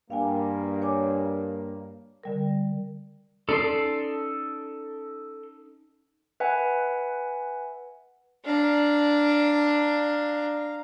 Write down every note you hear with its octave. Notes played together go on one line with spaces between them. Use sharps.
G2 A#3 F5 G5 G#5
C#5 G#5 D6
D3 G3 A#4
C#4 D#4 A4 D5 C6
B4 E5 F#5 G#5
D4 F5 A#5